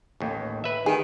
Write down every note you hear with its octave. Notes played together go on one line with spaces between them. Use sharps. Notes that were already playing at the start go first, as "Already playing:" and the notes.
A1 D#2
B4 E5
D#3 G#4